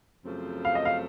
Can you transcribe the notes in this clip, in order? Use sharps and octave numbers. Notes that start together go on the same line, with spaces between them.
F#2 C#3 F3 A3 C4
F5
D#5
F5